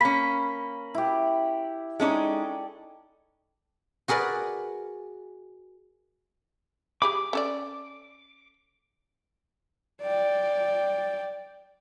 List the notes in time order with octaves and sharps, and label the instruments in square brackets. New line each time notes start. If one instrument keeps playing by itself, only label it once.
[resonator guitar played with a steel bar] A#3 C#4 [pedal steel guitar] B5
[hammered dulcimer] E4 G4
[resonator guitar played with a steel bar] G#3 C#4 D#4 [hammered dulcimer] A4 D5
[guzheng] F#4 G#4 A#4 B4 D5
[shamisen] G4 G#4 B5 [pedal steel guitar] D6
[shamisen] C#4 A4 D5
[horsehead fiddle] D5 G5